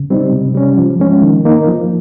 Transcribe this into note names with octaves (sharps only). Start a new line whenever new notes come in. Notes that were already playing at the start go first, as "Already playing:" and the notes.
Already playing: C#3
G3 C4 D#4
C3
G3 C#4
F3
G#3 C#4
D#3
A#3 D#4
F3